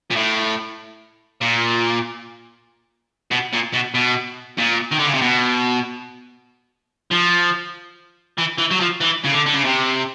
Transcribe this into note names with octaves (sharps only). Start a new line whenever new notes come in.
A#2
A2
A#2
B2
A#2
B2
B2
A#2
D#3
D3
C#3
C3
B2
F3
E3
E3
F#3
F3
E3
C#3
D3
D3
C#3
C3